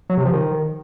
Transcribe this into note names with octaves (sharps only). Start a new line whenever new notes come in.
F#3
C3
F3
D#3